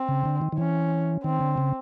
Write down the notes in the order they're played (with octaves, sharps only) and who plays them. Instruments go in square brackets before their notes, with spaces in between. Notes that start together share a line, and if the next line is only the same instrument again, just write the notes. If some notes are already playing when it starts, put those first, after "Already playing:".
Already playing: [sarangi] C4
[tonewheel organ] C#3
D3
D#3
D#3
[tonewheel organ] E3 [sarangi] C#4
[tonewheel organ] D#3 [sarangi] C4
[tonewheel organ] D3
C#3